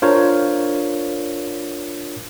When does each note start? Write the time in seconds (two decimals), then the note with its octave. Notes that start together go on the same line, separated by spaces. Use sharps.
0.02 D4 F4 A#4 C5 C#5